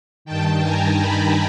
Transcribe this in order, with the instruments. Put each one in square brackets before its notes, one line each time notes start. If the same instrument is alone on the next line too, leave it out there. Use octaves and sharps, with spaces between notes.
[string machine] G2 D#3 G5 A5
G#5 A#5
A5 B5